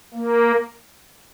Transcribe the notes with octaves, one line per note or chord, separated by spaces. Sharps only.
A#3